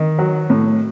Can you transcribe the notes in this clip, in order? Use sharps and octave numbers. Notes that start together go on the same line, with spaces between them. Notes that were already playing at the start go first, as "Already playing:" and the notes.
Already playing: D#3
F#3
A2